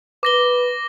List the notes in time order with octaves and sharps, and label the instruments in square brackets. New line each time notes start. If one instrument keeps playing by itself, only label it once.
[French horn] B4 [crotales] D6 A#6 G7